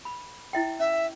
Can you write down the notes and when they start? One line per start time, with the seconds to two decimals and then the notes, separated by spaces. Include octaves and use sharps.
0.05 B5
0.53 E4 E5 G5
0.79 C#4 E5